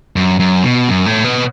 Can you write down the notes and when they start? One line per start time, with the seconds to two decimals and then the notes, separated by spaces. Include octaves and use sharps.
0.16 F#2
0.40 F#2
0.63 B2
0.89 F#2
1.06 A2
1.25 B2